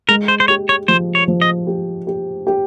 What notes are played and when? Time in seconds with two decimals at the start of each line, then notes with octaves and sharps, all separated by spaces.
0.09 G#3 A#4
0.28 C5
0.40 C5
0.48 G4 C#5
0.69 C#5
0.88 F3 C5
1.15 C#5
1.28 F3
1.42 D#5
1.67 G4
2.07 G4
2.47 G4